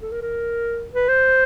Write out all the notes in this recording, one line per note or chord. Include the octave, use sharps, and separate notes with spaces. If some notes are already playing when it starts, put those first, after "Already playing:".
A4
A#4
A#4
B4
C5